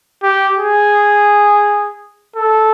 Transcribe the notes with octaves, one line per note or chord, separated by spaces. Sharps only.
G4
G#4
A4